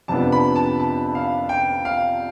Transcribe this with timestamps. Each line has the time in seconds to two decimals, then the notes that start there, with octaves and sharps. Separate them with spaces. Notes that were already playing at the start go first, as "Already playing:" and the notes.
0.08 F2 C3 F3 B3 D4 A5
0.32 B5
0.56 A5
0.80 A5
1.15 F5
1.49 G5
1.85 F5